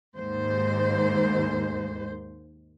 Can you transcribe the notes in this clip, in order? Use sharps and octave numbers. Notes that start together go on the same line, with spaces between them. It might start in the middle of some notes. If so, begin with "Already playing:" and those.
D#2 G#2 C5